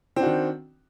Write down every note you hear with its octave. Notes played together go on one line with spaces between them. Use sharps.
D#3 C4 D4 F#4